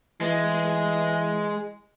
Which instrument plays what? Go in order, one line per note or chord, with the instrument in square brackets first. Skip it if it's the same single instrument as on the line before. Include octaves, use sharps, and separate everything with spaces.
[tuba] E3 [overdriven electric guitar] G#3